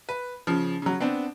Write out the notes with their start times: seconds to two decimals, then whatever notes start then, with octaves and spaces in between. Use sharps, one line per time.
0.09 B4
0.47 C#3 F3
0.82 C#3 F#3
1.00 B3 C4 D4